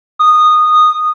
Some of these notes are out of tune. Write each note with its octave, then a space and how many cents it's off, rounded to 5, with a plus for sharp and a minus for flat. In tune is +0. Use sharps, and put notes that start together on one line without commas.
D#6 -15